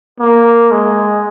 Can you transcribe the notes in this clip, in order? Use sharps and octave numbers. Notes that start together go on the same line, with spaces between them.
A#3
G#3